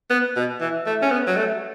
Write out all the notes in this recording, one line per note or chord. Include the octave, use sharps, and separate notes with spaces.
B3
B2
E3
A3
C#4
B3
F#3
A3